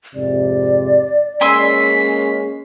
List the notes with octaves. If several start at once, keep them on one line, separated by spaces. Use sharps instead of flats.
F2 G#2 C3 D5
G#3 A#3 C#4 G#5 C6 E6 B6 C7